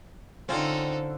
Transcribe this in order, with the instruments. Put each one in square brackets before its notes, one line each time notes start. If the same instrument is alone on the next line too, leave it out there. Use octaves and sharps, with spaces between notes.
[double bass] D3 [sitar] C4 [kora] C#4 F4 [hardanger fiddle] D#4 A4